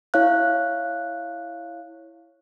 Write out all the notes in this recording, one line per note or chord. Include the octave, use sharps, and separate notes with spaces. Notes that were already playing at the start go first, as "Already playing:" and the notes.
E4 C#5 F5 F#6